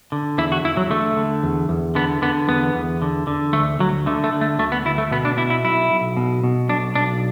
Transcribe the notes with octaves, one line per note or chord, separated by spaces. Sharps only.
D3
E2 E4
F#4
E2 E4
F#3
D3 A3
D3
E2
E2
D3 B3
D3 B3
E2 B3
E2
D3
D3
D2 A3
D2 F#3
D3 A3
A3
D3
A3
D2 A3
B3
D2 E4
A3
B2 B3
D4
B2 E4
E4
B1 E4
B1
B2
B2
B1 D4
B1 D4